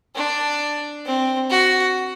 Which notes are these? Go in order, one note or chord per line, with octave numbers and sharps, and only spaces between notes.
D4
C4
F#4